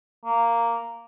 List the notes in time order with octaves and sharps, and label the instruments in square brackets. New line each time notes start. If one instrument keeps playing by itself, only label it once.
[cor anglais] A#3